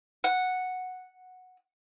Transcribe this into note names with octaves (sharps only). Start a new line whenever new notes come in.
F#5